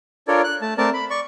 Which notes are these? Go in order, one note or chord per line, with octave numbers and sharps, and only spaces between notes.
D4 F4 A4 A#4 C#5 D5
F#6
A3 A5
A3 C4 A#4 D5 A5
B5
D5 C#6